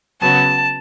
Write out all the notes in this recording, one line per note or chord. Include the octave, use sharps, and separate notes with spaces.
C#3 F#3 B3 A5